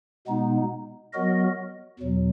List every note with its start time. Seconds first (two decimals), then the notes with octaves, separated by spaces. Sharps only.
0.27 B2 G#3 B3 D#4
1.13 F#3 B3 F#4 A#4 D#5
1.99 E2 B2 F#3